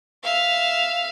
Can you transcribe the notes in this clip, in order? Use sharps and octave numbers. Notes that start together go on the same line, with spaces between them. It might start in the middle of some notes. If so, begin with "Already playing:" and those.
E5 F5